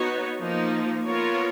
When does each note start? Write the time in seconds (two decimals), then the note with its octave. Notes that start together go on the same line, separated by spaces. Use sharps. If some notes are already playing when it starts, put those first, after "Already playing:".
Already playing: B3 D#4 F#4 C#5
0.39 F3 A#3 D#4
1.07 B3 F4 A#4 C#5